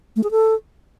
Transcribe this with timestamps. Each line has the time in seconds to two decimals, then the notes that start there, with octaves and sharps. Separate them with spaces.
0.16 A3
0.23 G#4
0.31 A4